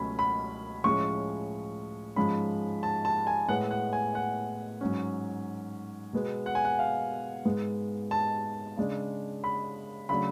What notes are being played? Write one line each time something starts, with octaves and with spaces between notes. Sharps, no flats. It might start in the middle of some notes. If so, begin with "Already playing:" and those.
Already playing: C#2 B2 F#3 A3 C#4 B5
B5
A2 F3 G#3 C#4 C#6
G#2 F3 G#3 C#4 B5
A5
A5
G#5
A2 G#3 B3 F#5
F#5
G#5
F#5
G#2 F#3 C#4
B2 G#3 B3
F#5
G#5
F#5
F5
G#2 G#3 B3
A5
C#3 G#3 D4
B5
C#3 F#3 A3 D4 B5